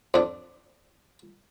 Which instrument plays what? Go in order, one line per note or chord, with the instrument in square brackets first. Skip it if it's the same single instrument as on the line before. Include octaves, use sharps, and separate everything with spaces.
[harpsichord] F2 D4